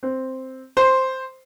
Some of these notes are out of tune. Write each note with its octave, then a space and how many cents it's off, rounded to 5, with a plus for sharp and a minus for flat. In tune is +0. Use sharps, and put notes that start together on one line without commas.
C4 +0
C5 +0